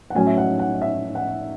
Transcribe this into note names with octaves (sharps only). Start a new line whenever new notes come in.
F#5
A2 F#3 C#4 G#5
E5
F#5
F#5
E5
F#5